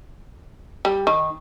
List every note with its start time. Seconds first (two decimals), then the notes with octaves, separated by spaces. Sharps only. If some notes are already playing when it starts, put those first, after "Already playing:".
0.85 G3
1.07 D#3